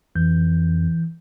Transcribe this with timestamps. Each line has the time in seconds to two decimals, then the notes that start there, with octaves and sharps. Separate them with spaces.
0.15 F2 E3 G6